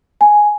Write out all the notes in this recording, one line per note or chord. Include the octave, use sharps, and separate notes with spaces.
G#5